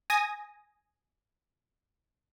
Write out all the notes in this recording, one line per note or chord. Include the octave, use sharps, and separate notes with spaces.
G#5 D#6 A#6